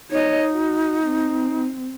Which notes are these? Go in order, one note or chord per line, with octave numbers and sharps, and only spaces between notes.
D#4 C#5 D#5
F#4
C4